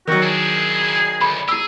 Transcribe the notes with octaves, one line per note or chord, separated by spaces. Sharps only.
D#3 F#3 F#4
D4 E4 G#4
D2 B5
E4 G4 G#4 E6